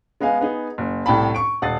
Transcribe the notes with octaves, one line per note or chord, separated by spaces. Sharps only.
G#3 B3 D#5 F5 G#5
B3 D#4 G#4
F#1
C2 A2 G5 A5 B5
C#6 D7
D#1 F#5 D#6 A6 C7